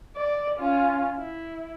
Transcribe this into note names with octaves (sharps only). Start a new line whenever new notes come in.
D5
C#4 F4
E4